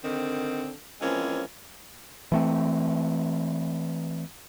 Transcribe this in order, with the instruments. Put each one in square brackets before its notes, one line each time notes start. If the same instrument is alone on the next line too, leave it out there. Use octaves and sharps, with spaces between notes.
[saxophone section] D3 D#3 C4
E3 F3 G#3 A#3 C4 C#4
[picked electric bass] E3 A3 C4